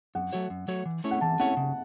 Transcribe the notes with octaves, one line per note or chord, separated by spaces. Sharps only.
F#2 F#5
F#3 A3 F#4 C#5
F#2
F#3 A3 F#4 C#5
E3
A3 C#4 E4 C#5
F#5
E3 A5
A3 C#4 E4 C#5 F#5
C#3